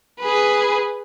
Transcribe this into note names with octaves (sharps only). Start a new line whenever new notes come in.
G#4 B4